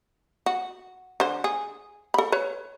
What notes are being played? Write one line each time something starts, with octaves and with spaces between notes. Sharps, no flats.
F#4
D3 C5
G#4
A4 B5
B4 C#5